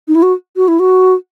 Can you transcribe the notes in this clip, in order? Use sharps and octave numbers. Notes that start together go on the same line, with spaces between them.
D#4
E4
F#4
F#4
E4
F#4